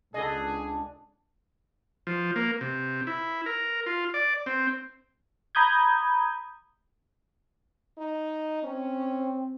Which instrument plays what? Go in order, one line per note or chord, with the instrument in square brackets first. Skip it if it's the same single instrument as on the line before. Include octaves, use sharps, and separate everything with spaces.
[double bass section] C#2 [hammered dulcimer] D3 D4 [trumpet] G#4 [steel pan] A4 D#5
[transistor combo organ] F3
A#3
C3
E4
A#4
F4
D5
C4
[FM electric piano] A#5 B5 D#6 G6 G#6
[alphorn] D#4
[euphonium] C4 [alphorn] C#4